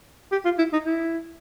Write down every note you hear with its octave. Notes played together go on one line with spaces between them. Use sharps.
G4
F4
E4
D#4
E4